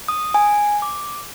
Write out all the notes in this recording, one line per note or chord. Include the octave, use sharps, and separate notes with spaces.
D#6
G#5
D6